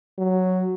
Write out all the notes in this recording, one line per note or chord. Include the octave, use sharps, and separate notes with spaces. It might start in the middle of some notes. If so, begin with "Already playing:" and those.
F#3